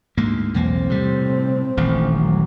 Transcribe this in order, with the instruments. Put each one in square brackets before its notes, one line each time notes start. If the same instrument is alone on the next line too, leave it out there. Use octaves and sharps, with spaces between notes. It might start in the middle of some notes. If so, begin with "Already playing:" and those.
[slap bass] D2 G#2 A#3
[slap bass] B1 E2 A#3 [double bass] A2 C4
[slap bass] C3 G3
D#1 A1 D#3
[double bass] F#3